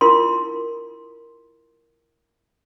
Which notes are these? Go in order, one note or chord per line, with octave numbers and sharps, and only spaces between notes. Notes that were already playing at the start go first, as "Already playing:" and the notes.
E4 F4 A#4 C6